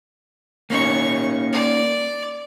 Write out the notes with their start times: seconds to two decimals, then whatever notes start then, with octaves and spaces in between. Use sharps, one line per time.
0.70 A#3 C#4 D#4 C#6
1.53 D5